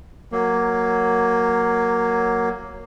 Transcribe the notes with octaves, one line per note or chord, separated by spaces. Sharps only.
F#3 A#3